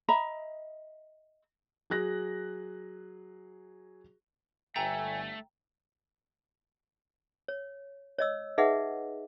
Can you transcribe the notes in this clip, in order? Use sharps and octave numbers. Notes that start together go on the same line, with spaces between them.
D#5 E5 A#5 B5
F#3 G#4 F#6 A#6
G1 A3 E5 G5 G#5 A#5
C#5
C#5 D#5 E6
D#4 G#4 B4 D#5 E5 F#5